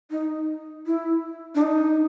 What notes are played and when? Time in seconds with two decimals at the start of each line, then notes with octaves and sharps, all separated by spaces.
0.11 D#4
0.86 E4
1.55 D4
1.62 D#4